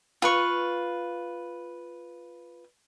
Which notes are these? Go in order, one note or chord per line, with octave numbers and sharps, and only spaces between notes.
F4 B4 C#6